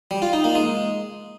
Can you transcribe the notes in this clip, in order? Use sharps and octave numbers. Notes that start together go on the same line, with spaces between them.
G3
F4
D#4
A#3
G#3